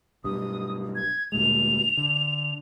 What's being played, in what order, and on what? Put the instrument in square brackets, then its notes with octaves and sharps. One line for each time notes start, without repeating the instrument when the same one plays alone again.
[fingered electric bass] B1 G2 [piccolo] D#6
[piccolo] G#6
[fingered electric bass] D2 A#2 G#3 [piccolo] F7
[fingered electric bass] D3